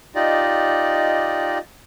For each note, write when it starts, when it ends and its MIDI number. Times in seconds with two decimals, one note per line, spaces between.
0.15 1.58 63
0.15 1.58 65
0.15 1.58 67
0.15 1.58 74
0.15 1.58 75